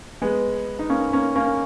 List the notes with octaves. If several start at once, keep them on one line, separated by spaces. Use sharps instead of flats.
G#3 B3
D#4
A#3 C#4
A#3 C#4
A#3 C#4